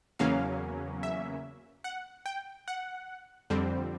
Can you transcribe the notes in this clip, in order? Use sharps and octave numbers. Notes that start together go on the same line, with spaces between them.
E2 C#3 F#3 A#3 C#4 F5
E5
F#5
G5
F#5
F2 D3 G3 C4